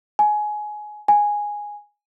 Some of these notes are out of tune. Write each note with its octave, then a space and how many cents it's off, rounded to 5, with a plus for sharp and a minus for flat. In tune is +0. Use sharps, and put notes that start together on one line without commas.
G#5 +20
G#5 -5